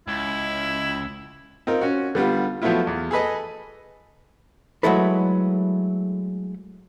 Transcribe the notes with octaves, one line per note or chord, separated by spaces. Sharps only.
C#2 E4
C4 D#4 F4 A#4
C#4 F#4
D3 G3 B3 F4
F3 F#3 A3 B3 E4 F4
E2
G#4 A4 B4 D#5
F#3 G#3 A3 E4 A4 B4